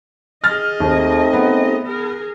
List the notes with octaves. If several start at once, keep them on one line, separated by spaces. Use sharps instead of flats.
G#4 D#5 F6 A6
D#2 A3 C4 D#4
B3
G#4 A#4